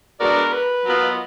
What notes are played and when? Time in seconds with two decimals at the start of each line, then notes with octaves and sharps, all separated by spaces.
0.20 G#3 B3 D4 F#4 A#4 D5
0.53 B4
0.86 F#3 B3 F4 A#4
1.02 D#5